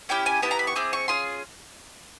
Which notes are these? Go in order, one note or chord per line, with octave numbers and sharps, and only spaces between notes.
C#4 E4 G4 G5
G#5
B3 E4 G4 A5
A#5
B5
C#6
C4 E4 G#4 D6
C#6
C#4 F4 G#4 C6